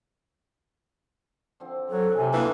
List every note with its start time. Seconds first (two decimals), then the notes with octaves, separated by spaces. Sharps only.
1.60 D3 F3 C4
1.90 F#3 A4
2.17 C3 G#5
2.33 D2 E3 A#3